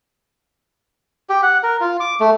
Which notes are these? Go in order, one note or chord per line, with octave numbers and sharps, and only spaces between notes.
G4
F#5
A#4
F4
D6
A3